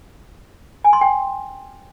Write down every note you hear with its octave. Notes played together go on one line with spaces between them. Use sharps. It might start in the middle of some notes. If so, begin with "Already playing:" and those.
G#5
C6
G5